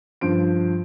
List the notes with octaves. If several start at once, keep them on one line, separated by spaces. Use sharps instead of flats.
G2 F3 C5 D7